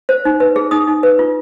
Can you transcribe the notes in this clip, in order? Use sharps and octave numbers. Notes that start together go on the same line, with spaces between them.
C5
D#4
B4
G#4
D#4 D#6
D#4
B4
F4